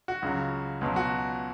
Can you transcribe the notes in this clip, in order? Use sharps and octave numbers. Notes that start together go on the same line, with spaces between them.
F#4
C#2 C#3 F#3
C#2 B2 F#3
F#4